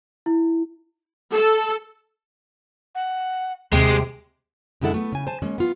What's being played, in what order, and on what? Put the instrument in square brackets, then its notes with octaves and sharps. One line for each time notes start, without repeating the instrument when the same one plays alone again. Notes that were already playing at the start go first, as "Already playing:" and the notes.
[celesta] E4
[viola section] A4
[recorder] F#5
[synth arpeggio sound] D#2 [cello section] C3 [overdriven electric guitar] G#3 [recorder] G5
[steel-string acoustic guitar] F#2 D3 G#3 E4 A4 F#5
A3 B3
C#3 G#5
C5 G#5 A5
G#3 A#3 C#4
B3 F4